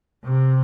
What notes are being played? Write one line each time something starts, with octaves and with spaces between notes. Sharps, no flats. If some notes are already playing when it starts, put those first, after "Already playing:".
C3